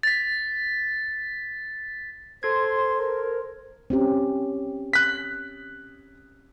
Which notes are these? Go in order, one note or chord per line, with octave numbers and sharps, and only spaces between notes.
A6 B6
A4 C5 C6 G#6
A#4
C4 C#4 G4
F#6 B6